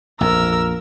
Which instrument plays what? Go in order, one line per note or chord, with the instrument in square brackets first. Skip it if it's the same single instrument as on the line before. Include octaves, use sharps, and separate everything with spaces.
[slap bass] A#1 F2 [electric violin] A#4 E6